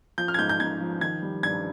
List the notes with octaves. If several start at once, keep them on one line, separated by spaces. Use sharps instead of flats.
F3 G6
F6
G#6
G#2 G6
G6
G#2 G#6
F3
D#3 G#6
G3
G2 G#6